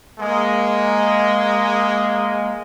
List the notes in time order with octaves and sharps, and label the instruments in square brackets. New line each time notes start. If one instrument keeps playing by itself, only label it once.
[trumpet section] G#3 A#3